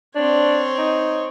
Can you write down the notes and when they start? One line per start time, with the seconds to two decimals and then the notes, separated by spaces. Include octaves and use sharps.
0.15 C4 D4 C#5
0.78 D#4